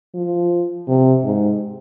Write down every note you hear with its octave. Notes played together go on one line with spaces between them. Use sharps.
F3
C3
G#2